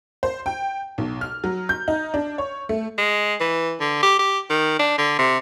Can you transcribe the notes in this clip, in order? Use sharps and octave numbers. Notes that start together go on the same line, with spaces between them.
C5
G5
B1
F6
F#3
G6
D#4
D4
C#5
A3
G#3
E3
D3
G4
G4
D#3
D4
D3
C3